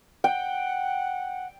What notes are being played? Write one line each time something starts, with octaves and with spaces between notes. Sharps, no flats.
F#5 G5